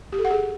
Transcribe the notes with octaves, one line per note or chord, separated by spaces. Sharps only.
G4
A4
F#5
G#4